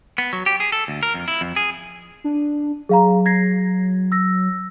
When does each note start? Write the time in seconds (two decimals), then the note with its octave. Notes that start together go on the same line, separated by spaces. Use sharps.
0.18 B3
0.33 F#3
0.46 G4
0.60 G#4
0.72 A4
0.88 D2
1.03 A#4
1.14 F2
1.28 E4
1.41 F2
1.56 G#4
2.24 D4
2.89 F#3 G#4 F5 A#5
3.26 G#6 A#6 C7
4.12 E6 A#6